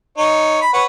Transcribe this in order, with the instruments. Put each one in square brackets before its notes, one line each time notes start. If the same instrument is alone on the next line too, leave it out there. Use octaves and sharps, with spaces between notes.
[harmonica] D#4 C#5
B5
B4 C#5 F#5